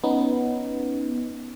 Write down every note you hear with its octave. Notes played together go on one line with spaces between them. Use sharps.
B3 C#4 D#4